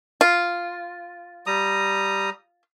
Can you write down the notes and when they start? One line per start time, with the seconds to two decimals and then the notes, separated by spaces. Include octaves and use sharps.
0.21 F4
1.46 G3 A#5 D#6